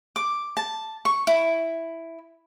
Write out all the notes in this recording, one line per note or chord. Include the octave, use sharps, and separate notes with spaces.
D6
A5
C#6
E4